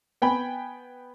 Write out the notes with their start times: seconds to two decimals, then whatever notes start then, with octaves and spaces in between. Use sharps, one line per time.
0.22 B3 G5 G#5 B5